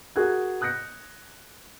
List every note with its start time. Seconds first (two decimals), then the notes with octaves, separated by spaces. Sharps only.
0.16 F#4 G#4 A#4 F#6 G#6
0.61 D#6 F#6 G6 A#6 C#7